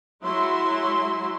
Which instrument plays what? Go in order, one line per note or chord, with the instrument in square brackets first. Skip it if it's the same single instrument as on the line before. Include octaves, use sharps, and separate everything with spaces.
[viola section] F#3 G#3 E4 F#4 E5 C6